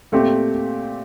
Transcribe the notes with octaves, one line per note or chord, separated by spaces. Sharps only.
A#2 A3 C4 G4